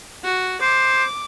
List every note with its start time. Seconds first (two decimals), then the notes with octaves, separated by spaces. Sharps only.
0.24 F#4
0.62 C5 D6